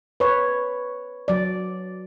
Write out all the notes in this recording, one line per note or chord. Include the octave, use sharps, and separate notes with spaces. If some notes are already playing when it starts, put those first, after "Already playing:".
B4 C#5
F#3 D5